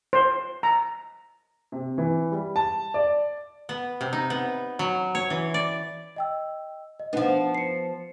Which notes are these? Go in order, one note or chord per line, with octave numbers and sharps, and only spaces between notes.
C5
A#5
C3
E3
G3
A5
D5
B3
C3
D#4
B3
F#3
C#5
E3
D5
D#5 G5 E6
D#5
F3 B3 D4 D#4 F#5
C7 C#7